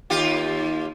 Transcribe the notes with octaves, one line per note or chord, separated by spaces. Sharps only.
D#2 F4 G4